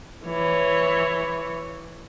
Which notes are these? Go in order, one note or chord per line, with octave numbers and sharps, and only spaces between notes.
E3 C#5